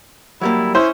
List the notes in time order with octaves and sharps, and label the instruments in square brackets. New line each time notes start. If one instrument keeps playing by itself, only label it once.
[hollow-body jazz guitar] F#3 G3 A#3 [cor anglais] E4
[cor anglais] C#4 [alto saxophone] E4 [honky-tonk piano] C5